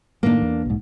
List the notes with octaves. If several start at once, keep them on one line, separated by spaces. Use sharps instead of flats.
A2 D#3 A#3 D4
E2
B1 G#2